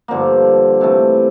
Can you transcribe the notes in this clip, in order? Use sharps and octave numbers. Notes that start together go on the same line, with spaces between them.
G2 D3 F3 A#3
C3 E3 A3